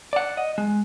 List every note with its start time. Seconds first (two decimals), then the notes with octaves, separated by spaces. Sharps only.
0.13 D5 F#5
0.37 D#5
0.58 G#3